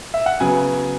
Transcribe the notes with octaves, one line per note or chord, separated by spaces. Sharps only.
E5
F#5
C#3 F#3 B3 G#5